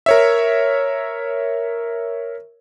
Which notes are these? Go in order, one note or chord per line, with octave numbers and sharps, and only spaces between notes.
A#4 C#5 E5